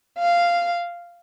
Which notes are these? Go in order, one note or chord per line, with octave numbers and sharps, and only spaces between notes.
F5